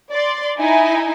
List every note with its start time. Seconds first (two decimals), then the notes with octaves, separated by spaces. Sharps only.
0.10 D5 C6
0.59 D#4 E4 G#5